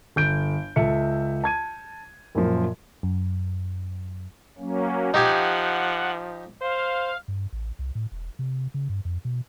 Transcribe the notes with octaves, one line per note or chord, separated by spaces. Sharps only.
G1 G6 D7
C#2 A4 E5 C#7
A5 G#6 D#7
F#2 A#2 F3
F#2
F#3 A#3 C#4
F3 D#4 G4 F#5 G#5
C5 F5
G2
A1
C2
A2
E1
C3
C#3
G2
F2
B2